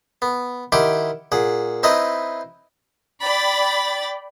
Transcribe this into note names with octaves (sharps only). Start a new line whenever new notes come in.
B3
D#3 E4 G4 F#5 C6 D6
A#2 G#4 F#5
C4 D#4 E4 B4 D#5 A#5
D5 G5 B5 A6